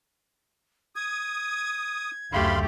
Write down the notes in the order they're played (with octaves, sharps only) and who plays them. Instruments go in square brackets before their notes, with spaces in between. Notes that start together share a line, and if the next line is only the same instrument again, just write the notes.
[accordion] D#6 [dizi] G#6
[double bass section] F#1 D2 [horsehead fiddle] A3 G4 [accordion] F5 B5 C6